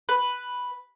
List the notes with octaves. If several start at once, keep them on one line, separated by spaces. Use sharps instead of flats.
B4